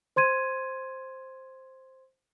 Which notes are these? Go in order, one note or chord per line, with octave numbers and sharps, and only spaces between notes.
C5 C6 G#6 D#7